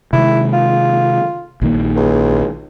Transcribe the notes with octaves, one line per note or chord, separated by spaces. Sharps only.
C3 D#3 G#3 E4
F4
A#1 D#3 A#3
C#2